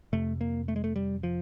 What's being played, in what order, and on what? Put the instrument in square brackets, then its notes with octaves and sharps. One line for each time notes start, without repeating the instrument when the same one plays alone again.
[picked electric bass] F2 C3 A3
A#3
A3
G#3
A3
G3
F3